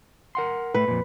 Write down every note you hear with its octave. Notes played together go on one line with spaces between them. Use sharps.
A#4 F#5 C6
A2 A3 B4
F2 A#2